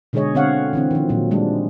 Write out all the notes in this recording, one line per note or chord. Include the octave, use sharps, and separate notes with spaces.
B2 D3 G#3 G#4 C#5 D#5
D3 C4 C#5 F5 F#5
D3 E3 C4
D#3 F3
A#2 F3 F#3
F3 G3 G#3 D4